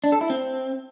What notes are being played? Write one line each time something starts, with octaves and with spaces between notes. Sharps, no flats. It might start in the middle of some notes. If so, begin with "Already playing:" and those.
D4
A4
E4
C4